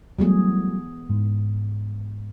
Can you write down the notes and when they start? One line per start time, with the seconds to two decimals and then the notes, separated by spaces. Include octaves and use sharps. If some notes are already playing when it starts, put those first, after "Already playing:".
0.19 E3 F#3 G3 A3 B3 G#4
1.09 G#2